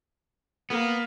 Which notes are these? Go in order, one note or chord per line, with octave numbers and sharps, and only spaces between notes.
A#3 B3